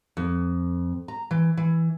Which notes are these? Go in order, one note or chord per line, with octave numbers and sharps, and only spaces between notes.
F2
A#5
E3
E3